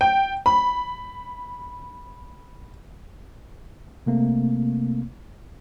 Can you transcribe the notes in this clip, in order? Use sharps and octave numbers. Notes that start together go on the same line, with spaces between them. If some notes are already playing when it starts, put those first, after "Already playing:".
G5
B5
C3 A3 A#3 C4